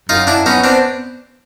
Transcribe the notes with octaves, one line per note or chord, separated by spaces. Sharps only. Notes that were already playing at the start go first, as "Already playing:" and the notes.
F#2 D#4 F4
D4 E4
B3 C#4 D#4
C4 D4